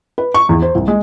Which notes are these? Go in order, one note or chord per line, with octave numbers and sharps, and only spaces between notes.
B4
C#6
E2
C5
C2
G#3